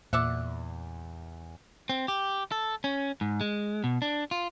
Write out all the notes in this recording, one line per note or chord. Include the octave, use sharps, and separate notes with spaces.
E2 A#2 D5 E5 F#5
C4
G4
A4
C#4
G#2
G#3
B2
D4
F4